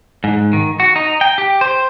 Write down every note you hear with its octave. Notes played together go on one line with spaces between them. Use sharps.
G#2
D#3
F#4
D#4
G5
G4
C5